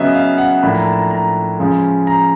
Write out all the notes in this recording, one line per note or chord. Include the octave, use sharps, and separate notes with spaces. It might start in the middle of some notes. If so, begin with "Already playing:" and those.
Already playing: C#3 F#3 B3 D#5 E5
F5
F#5
A2 F3 A#3 D4 B5
A#5
A5
A#5
A#5
C#3 F3 G#3
A#5